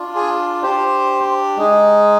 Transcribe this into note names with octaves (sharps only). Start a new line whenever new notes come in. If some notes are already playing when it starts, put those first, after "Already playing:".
Already playing: D4 F4
G#4
D4 G4 C5
G#3 D#4 G#4